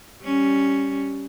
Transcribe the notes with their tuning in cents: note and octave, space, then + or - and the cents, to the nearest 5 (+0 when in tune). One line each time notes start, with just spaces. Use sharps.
G3 -5 C#4 +0